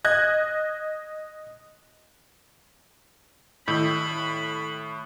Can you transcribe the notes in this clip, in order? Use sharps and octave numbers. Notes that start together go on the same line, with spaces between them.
D#5 F#6 G#6
A2 D#3 E4 B5